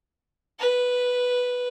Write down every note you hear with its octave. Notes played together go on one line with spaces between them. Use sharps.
B4